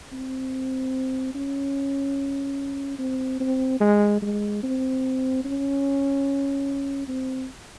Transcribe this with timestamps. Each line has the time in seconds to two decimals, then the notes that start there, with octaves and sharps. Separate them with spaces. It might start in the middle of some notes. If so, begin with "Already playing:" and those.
0.12 C4
1.35 C#4
2.99 C4
3.40 C4
3.80 G#3
4.22 G#3
4.63 C4
5.44 C#4
7.08 C4